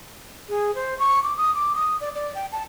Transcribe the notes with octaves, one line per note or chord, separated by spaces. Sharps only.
G#4
C5
C#6
D6
D#6
D6
D#6
D5
D5
G5
A5